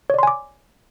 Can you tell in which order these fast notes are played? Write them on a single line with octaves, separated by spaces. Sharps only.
C#5 D5 C6 G#5 D6